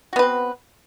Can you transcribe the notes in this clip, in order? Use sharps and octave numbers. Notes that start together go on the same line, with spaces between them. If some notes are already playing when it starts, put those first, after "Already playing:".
B3 C4 F#4 B4